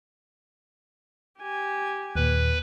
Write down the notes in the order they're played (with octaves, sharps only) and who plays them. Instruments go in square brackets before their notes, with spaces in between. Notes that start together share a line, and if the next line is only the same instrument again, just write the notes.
[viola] G4 G#5
[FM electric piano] D#2 A#2 [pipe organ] B4